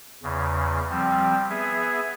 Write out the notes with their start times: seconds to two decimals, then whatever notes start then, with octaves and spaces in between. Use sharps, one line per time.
0.23 E2 C#3
0.90 F3 G3 C4
1.49 B3 G#4 E5